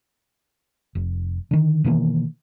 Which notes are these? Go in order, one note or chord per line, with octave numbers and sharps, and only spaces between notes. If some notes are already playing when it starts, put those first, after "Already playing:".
F1
D3 D#3
B2 D#3 E3 A#3